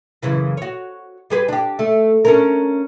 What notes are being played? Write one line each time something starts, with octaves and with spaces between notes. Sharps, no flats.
F#2 C#3 E3
F#4 C#5
G3 G#4 B4
D4 G4
A3
C#4 D4 A#4